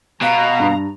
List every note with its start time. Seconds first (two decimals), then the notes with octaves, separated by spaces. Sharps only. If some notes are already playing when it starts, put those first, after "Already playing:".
0.22 B2 F5 A#5
0.60 G2